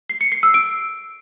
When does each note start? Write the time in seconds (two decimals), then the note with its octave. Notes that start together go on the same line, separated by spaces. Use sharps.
0.10 C7
0.21 C#7
0.32 C7
0.43 E6
0.54 D7